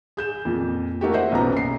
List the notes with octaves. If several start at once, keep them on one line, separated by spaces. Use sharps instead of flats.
G#4 G6 E7
F2 A#2
A3 A#3 D#4 F#4 G4
C5 D#5 E5 F#5
B1 F#2 A#2 B3 A#5
B1 C7